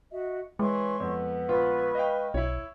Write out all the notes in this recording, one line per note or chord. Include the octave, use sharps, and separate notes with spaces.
F#4 D#5 E5
E3 G#3 C#5 C6 C#6
F2 B3
A#1 F4 B4 C#6
D#5 F5 G5
B1 E4 C#5